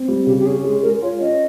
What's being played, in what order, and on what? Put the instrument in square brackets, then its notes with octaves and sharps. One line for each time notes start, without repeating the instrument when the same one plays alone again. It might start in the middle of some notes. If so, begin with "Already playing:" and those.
Already playing: [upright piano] C4
G3
[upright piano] C#3 [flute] G4
[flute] G4
[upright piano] C#4 [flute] G#4
[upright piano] G#3 [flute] G#4
[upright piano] G#3 [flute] A#4
[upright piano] F4 [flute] C#5
[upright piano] C#4 [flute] D#5